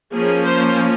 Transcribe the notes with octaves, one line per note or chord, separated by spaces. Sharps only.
F3 A#3 C#4 G#4
C5